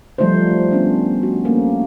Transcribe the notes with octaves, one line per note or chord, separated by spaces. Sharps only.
F3 G3 A3 D#4 F4 C5
B3 C#4 D4
F#4
A3 A#3 C#4